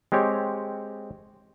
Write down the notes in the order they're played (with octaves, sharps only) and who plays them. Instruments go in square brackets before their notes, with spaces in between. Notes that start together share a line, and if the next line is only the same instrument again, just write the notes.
[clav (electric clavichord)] G#3 C4 G4 C#5